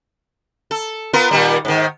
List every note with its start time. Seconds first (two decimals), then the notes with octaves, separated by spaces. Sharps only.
0.71 A4
1.13 B3 F4 A#4
1.31 A#2 D#3 G3
1.65 G#2 D#3